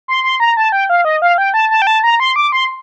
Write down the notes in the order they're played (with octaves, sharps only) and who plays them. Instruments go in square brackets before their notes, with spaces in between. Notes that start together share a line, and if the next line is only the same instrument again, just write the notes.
[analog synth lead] C6
C6
A#5
A5
G5
F5
D#5
F5
G5
A5
A5
G5
A5
A#5
C6
D6
C6